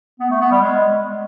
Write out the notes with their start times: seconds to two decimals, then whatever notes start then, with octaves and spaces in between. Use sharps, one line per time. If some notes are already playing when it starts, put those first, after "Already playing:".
0.20 B3
0.30 A3
0.41 B3
0.51 G3
0.62 G#3